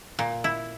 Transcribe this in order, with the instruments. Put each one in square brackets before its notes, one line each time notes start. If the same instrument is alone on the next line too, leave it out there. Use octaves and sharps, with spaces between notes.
[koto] A#2
E4